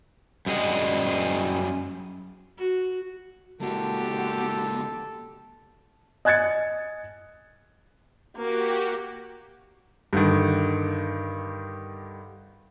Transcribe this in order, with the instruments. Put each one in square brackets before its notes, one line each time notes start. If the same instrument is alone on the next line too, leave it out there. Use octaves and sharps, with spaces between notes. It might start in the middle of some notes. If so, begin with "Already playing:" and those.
[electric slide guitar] F#2 G3 G#4 D#5 F#5
[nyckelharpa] F#4
[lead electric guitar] C#2 A#3 [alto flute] F#4 [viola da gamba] G4 [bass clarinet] A4
[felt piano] D#5 G#5 F#6 G#6 A6 C#7
[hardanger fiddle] A#3 [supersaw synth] F#4 G4
[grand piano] G2 D3 D#3